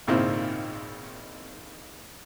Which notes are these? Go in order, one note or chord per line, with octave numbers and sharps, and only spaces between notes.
G#1 A#2 C#3 C4 D#4 E4